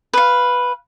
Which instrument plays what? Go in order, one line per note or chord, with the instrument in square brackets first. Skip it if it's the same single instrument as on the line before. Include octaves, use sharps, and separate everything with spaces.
[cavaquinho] B4 F5